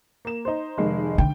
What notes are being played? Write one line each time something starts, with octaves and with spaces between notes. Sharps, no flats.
A#3 E7
D#4 C5
F1 D#3 G#3
D3 G5